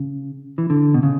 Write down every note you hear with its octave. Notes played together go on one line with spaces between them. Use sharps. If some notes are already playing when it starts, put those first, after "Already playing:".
Already playing: C#3
E3
D3
B2
C#3